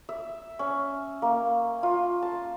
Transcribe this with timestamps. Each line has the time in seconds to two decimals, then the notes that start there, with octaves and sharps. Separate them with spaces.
0.09 E5
0.59 C#4
1.22 A#3
1.83 F4
2.22 A5